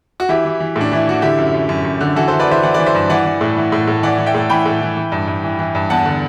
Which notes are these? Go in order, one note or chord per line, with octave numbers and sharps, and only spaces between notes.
F#4
E3 E4 G4
E3
E3
A2 D4
E3 E4
E3 F#4
D3 E4 G4
F#2
F#2
F#2
F#2
D3
E3 F#4 A4
E3 A4 C5
B4 D5
E3 C5 E5
E3 D5 F#5
E3 B4 D5
C5 E5
G2
E3 D5 F#5
E3
A2
E3
A2
A2
E3 D5 F#5
E3
E5 G5
A2
E3 G5 B5
A2
E3
E3
G2
G2
E3
E3
G2
E2 F#5 A5
D3